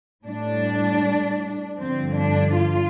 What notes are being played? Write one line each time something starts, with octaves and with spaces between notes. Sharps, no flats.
A2 G3 D4
G2 D3 F3 C4
D4
F4